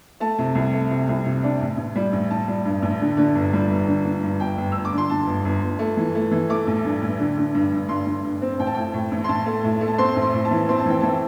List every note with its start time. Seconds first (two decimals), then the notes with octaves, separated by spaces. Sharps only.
0.20 A3 A5
0.38 C3
0.55 C2
0.73 A3
0.90 C3
1.09 C2
1.26 C3
1.44 D4
1.61 A1
1.77 A1
1.95 G3
2.13 A1
2.31 A1 A5
2.48 G3
2.65 G2
2.82 A1
3.01 D3
3.17 D3
3.35 G1
3.53 G3
3.70 G1
3.87 D3
4.05 D3
4.23 G2
4.40 G1 G5
4.57 G1
4.72 G1 E6
4.85 D6
4.93 D3
4.98 C6
5.09 D3 A5
5.27 G1
5.45 G1
5.62 G1
5.79 A3
5.97 E3
6.15 A3
6.31 E3
6.49 A3 D6
6.67 A1
6.85 G2
7.02 A1
7.19 D3
7.37 D3
7.55 G2
7.72 G2
7.89 G2 C6
8.06 G2
8.24 G2
8.42 C4
8.59 A1 G5
8.67 A5
8.74 A2 G5
8.94 A2
9.12 A1
9.24 C6
9.29 A1 A5
9.46 A3
9.64 A2
9.81 A3
9.88 A5
9.98 C4 C6
10.16 A1
10.22 C6
10.34 A2
10.45 A5
10.51 E3
10.69 C4 C6
10.79 A5
10.86 E3 G5
11.01 E3 A5